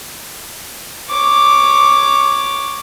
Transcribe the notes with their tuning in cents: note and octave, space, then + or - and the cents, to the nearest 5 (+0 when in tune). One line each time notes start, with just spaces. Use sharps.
C#5 +0 D6 +0